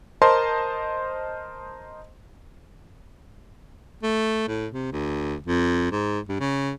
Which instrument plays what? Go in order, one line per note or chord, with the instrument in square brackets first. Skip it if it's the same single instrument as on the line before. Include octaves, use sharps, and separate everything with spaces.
[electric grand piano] A#4 C5 D#5 A5 C6
[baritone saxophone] A3
A2
C3
D2
F2
G#2
G2
C#3